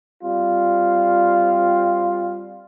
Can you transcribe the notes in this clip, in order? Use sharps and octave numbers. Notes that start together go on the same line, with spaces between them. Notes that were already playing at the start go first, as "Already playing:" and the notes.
G3 C4 F4